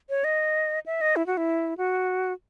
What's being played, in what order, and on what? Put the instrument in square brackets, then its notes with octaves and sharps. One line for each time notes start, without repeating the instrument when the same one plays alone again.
[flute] C#5
D#5
E5
D#5
E4
F#4
E4
F#4